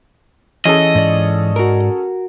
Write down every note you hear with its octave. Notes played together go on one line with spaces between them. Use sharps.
E3 C#4 G#4 A4 D#5
G#2 D5
F#4 A#4